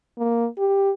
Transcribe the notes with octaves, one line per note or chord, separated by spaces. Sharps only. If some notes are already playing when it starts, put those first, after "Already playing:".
A#3
G4